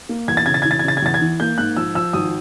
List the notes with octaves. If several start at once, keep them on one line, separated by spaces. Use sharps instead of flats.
A#3
E2 G#6
A6
C#3 G#6
A6
E3 G#6
A6
G#6
C#3 A6
G#6
E2 A6
G#6
E3
A#3 G6
G#2 F#6
F3 E6
F3 E6
G#1 D#6